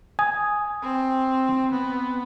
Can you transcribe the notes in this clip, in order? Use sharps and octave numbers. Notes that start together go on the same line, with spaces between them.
G#5 D#6
C4
B3